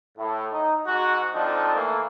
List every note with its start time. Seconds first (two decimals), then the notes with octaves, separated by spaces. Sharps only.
0.17 A2
0.53 D#4
0.86 G#2 F#4
1.34 D3 F3 C4 D4 D#4
1.74 E3 A3 A#3